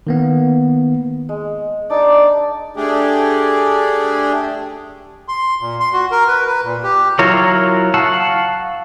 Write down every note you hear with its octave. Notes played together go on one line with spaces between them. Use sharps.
D#3 A#3 B3
G#3
D4 D#4 D5
A3 D4 G4 G#4
C6
A#2
C6
F#4
A#4
B4
B4
A#2
G4
F#3 E4 F4 A#4 C#5
F5 F#5 A5 C#6 E6